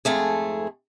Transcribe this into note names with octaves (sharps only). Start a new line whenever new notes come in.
F2 G#2 A3 G#4